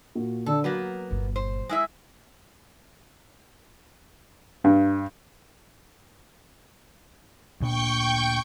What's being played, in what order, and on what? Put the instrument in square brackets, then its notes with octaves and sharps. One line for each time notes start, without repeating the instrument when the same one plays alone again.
[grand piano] A#2 F#4
[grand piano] D3 D4 [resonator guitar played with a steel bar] A4
[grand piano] F#3 [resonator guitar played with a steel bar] A#3 B3 B4
[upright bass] G1 A#2
[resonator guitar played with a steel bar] C5
G#3 E4 E5
[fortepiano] G2
[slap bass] D2 A#2 D4 [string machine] G5 C#6 G6